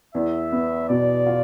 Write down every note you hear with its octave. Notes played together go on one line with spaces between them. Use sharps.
E2 E5
B3
B2 D5
F4